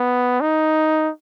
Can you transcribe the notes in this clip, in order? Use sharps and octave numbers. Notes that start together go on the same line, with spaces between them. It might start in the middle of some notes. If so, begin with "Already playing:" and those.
Already playing: B3
D#4